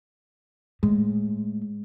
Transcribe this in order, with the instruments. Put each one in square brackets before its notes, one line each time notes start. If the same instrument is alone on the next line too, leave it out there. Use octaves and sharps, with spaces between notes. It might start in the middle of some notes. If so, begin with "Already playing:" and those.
[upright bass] A2 [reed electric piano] G#3